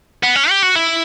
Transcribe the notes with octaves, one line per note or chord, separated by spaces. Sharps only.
B3
C#4
G4
F#4
E4